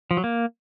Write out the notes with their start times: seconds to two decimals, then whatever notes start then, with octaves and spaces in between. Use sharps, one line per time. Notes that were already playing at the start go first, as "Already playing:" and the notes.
0.11 F3
0.17 F#3
0.24 A#3